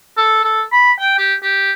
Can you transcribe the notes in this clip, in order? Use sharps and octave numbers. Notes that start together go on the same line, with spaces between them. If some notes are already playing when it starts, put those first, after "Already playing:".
A4
A4
B5
G5
G4
G4